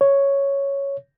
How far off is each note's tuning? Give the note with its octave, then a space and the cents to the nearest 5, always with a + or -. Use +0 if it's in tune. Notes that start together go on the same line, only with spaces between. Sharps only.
C#5 +0